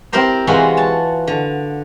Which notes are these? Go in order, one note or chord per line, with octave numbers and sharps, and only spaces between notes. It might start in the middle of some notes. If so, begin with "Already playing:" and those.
C4 E4 G4 A#4 C5
C3 E3 G#3 F4 F#4 B4
C#5 A5
D3